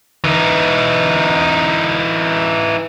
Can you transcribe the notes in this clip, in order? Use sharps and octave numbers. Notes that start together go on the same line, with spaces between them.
E3 D#4